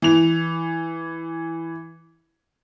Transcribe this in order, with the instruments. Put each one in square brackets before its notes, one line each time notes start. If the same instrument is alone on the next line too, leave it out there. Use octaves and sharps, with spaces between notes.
[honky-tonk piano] E3 F7